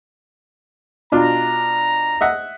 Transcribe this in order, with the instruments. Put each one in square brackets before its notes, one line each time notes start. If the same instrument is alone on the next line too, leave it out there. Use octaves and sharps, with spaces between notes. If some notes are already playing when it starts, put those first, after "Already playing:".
[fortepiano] B2 D4 F4 [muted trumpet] A#5
[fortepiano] D#5 E5 F#5